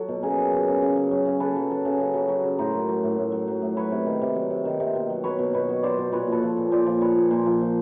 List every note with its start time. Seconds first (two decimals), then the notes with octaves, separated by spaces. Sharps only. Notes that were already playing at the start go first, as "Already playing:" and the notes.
Already playing: F#3 A4
0.09 B2
0.23 C#3 G#4 A#4
0.37 F#3
0.52 F#3
0.68 C#3
0.82 C#3
0.96 F#3
1.11 F#3
1.26 C#3
1.40 C#3 A4 B4
1.56 F#3
1.71 F#3
1.85 C#3
2.00 C#3
2.14 F#3
2.29 F#3
2.44 C#3
2.59 A2 A#4 C5
2.73 F#3
2.88 F#3
3.03 A2
3.18 A2
3.32 F#3
3.48 F#3
3.62 A2
3.76 F#3 B4 C#5
3.92 C3
4.06 D#3
4.22 C3
4.36 F#3
4.50 C3
4.65 D#3
4.80 C3
4.95 B2
5.10 F#3
5.24 F#3 B4 C#5
5.39 B2
5.54 B2 B4 C#5
5.69 F#3
5.83 F#3 C5 D5
5.98 B2
6.12 A#2 B4 C#5
6.27 F3 A4 B4
6.43 F3
6.57 A#2
6.72 A#2 C5 D5
6.86 F3
7.01 F3 B4 C#5
7.16 A#2
7.31 A#2 A#4 C5
7.46 F3
7.61 F3